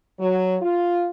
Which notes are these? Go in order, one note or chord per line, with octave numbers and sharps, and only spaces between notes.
F#3
F4